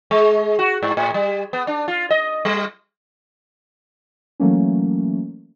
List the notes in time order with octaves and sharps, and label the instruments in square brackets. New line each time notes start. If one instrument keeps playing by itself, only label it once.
[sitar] G#3
F#4
G#2
A2
G3
B3
D4
F4
D#5
G3
[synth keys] E3 F#3 A3 A#3 C#4